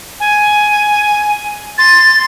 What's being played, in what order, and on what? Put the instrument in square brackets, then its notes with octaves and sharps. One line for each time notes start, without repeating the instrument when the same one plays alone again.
[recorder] G#5
[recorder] C6 [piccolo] A6